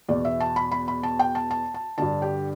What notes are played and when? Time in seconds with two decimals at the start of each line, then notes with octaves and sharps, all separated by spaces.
0.09 E2 B2 D5
0.25 E5
0.40 A5
0.56 B5
0.72 B5
0.88 B5
1.03 A5
1.19 G5
1.35 A5
1.51 A5
1.74 A5
1.98 G2 D3 A5
2.22 G4